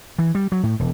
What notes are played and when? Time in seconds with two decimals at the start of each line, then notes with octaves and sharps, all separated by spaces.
0.19 E3
0.35 G3
0.52 F#3
0.63 A2
0.80 E1